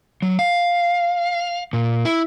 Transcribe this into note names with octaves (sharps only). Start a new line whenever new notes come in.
F#3
F5
A#2
E4